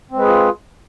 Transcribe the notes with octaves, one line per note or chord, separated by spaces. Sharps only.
G#3 C4 F4 G#4 B4